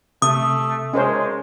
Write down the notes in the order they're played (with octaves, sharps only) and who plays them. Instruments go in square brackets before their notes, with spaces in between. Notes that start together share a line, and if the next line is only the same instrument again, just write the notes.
[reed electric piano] C3 [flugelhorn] A3 [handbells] D#6
[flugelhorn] G#3 [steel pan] C#4 A#4 C5